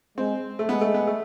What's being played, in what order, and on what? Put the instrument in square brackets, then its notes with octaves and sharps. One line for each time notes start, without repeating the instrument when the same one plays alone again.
[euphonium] G#3 [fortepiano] C4
[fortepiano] A3
[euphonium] G#3 [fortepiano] B3
[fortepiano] A3
B3
A3